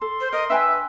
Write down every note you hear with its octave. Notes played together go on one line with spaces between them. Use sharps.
A4 C6
C5
A#4 D#5
D4 B4 E5 G5 G#5